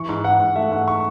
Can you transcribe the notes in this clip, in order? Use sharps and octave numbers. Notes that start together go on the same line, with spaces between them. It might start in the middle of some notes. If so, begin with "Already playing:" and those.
Already playing: E3 C#6
G#2
G#2 F#5
G#2
A3 E5
G#2 F#5
C#6